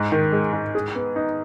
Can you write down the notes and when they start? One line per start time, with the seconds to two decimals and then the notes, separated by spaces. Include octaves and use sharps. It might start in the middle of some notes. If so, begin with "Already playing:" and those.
Already playing: G#2
0.12 D#3
0.32 G#3
0.53 G#2
0.75 G#4
0.95 B3
1.16 D#4